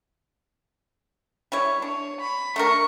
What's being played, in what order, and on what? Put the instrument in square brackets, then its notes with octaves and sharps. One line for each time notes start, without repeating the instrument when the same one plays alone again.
[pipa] G3 E4 C#5
[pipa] D4 [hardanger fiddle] C#5
[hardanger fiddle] B5
[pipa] A3 D4 A#4 [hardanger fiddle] C#6